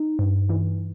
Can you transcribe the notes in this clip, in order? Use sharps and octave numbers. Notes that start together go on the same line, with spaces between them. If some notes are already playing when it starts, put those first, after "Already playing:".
Already playing: D#4
G2
E3